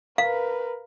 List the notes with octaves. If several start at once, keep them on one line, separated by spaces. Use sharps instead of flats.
A#4 B4 F5